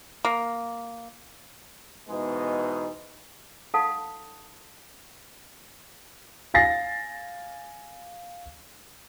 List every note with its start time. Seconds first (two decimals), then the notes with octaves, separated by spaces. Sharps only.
0.25 A#3
2.09 G#2 B2 E3 G#3 B3 D#4
3.74 D#4 A4 F5 F#5 A5 D#6
6.54 F5 G#5 A6 A#6 C7